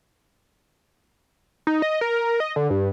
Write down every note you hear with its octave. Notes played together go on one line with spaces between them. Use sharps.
D#4
D#5
A#4
D#5
D3
G2